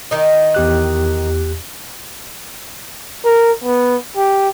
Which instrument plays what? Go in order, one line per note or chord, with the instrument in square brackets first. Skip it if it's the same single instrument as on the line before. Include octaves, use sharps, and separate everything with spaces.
[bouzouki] D#3 D#4
[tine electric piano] E2 G4 F#6
[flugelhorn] A#4
B3
G4